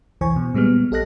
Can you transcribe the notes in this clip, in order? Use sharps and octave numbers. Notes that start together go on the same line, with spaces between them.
C2 F2 E3 C5 G#5 C#6
B2
A#2 G3 G#3 B3 F6
A#1 G4 A4 D#5 F#6 A#6